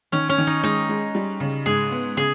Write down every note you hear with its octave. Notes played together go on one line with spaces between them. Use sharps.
D#3 C#4
C#4
D#3
D#4
G#3 D#4
G#3
G3
C#3
G#2 G#4
B3
C#3 G#4